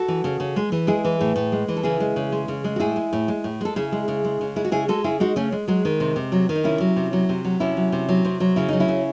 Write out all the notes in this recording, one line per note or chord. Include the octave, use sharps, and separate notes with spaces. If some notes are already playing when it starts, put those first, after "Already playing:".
Already playing: F#4 A4
E3
C#3
C#3
G#3
E3
G#3 E4 G#4
E3
A2
A2
G#3
E3
A4
C#3 E4 G#4
G#3
C#3
G#3
C#3
G#3
F#4
A2 E4 G#4
G#3
A2
G#3
A2
G#3 A4
C#3 E4 G#4
G#3
C#3
G#3
C#3
G#3 E4
F#4
C#3 E4 G#4
G#3 F#4 A4
C#3 E4 G#4
G#3 D#4 F#4
C#3 A3 C#4
G#3
F#3 G#3
D#3
C3
C3
F#3
D#3
D#4
C3 C#4 E4
F#3
C3
F#3
C3
F#3
C3 C#4 E4
F#3
C3
F#3
C3
F#3
C#3 E4
F#3 D#4
C#4 E4
C#3